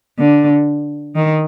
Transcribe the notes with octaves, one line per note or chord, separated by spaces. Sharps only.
D3
D#3